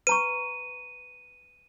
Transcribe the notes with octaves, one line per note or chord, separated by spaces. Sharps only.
B4 A#5 C#6 D#7